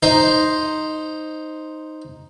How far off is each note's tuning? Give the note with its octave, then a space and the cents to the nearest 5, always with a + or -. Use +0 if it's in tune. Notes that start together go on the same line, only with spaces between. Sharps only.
D#4 +0 C5 +0